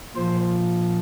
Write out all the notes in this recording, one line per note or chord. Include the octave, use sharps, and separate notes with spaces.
A#2 F3 C5